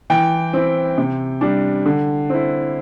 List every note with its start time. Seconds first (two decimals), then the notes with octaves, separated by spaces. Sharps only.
0.10 E3 G5
0.53 C4 E4
0.98 C3
1.41 G3 D4
1.86 D3
2.30 C4 E4